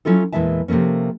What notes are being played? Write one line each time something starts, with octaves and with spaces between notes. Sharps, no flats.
F#3 C#4 E4 F4 A4
E2 A#2 E3 G#3 E5 A5
C3 F3 A3 A#3 C#4